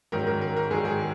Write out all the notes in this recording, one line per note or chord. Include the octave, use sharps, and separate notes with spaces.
G#2 D#3 F#3 C#4 A#4
A#4
A#4
A#4
G#2 D#3 F#3 G#4
G#4